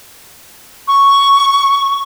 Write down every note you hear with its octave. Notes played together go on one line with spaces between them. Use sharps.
C#6